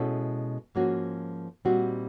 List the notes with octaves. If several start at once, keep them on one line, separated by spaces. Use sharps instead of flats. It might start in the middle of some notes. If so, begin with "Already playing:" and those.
Already playing: B2 G#3 C#4 E4 A4
G#2 F3 A#3 C#4 F#4
A#2 G3 C4 D#4 F#4